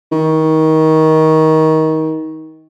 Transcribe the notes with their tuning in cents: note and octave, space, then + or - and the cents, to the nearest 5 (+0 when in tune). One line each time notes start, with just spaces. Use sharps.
D#3 +25